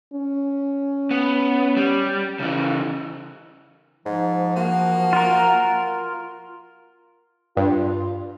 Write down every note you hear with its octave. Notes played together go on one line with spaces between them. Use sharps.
C#4
B3
G3
C#3 E3
G#2 F3
A#3 F#4
F4 A#4
G2 F4